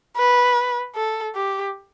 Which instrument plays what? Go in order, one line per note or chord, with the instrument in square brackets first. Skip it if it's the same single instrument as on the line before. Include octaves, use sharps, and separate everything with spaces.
[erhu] B4
A4
G4